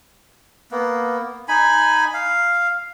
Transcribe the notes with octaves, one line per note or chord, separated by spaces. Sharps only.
A#3 B3
D#4 G#5 B5
F5